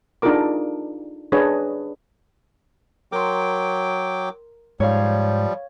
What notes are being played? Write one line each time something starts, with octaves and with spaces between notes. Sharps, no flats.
D4 D#4 F4 G#4 A#4 D6
D4 G#4 B4 C#5 D#5
F#3 A#4 G5 C6 D6
G#2 F3 G3 C#5 F5